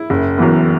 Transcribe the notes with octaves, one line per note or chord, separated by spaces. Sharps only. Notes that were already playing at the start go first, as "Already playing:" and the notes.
Already playing: E4
F#1
F#2 E3 B3